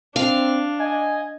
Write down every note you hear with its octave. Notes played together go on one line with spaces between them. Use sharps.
C4 D4 F5
D#5 G#5